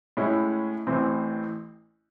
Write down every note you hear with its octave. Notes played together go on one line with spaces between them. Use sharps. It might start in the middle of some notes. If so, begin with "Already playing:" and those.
A2 G#3 C#4 E4
A1 A2 E3 C4